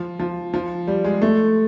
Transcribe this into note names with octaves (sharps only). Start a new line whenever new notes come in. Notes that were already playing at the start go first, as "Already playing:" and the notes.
Already playing: F3
F3
F3
G3
G#3
A3